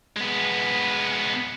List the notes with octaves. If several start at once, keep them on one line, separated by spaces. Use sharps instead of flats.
G#3 B3